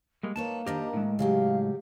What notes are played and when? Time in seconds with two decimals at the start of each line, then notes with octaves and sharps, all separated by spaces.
0.23 G3 G#3 A#3
0.36 A#3 D#4 B4 C#5 A5
0.66 D#3 D4 G4 A#4 C5 D#5
0.93 A2 G#3
1.19 C#3 F#3 G4 F5